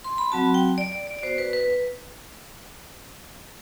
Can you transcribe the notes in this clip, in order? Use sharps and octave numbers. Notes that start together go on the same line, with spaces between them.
C6
B5
F#3 C4 F#4 A5
G5
D5
D5
D5
D5
B3 F#4 C5
B4
B4